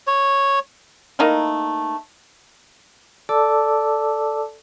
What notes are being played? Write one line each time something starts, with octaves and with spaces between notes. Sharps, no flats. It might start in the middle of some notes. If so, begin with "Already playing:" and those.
C#5
A3 A#3 D#4 E4
A4 D5 A5 D6 E6